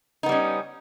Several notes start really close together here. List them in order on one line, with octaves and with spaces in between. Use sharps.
D#4 B3 G3 C#4